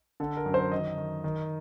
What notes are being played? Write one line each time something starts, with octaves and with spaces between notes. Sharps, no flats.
D3 A4
A#4
F#2
C5
D#3 D#5
D#3
D#3